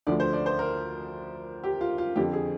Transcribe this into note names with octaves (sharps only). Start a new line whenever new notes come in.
D2 D3 F3 D5
C5
D5
C5
A#4
G4
F4
F4
F2 D3 F3 G4
G#4